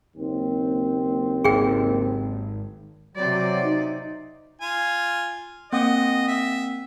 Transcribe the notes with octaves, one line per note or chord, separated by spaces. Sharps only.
F#1 D#2 C4
G#1 G#4 G5
C3 F#3 D5
D#4
F4 G#5
A#3 C4 D#5 F#5
E5